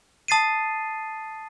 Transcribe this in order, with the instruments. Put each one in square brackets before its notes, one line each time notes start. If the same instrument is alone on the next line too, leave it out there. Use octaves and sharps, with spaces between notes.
[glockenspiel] A5 D#6 A6 C7 D#7